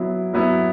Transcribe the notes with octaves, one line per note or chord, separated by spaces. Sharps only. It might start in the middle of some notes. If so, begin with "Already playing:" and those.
Already playing: F#3 B3 E4
F#3 B3 E4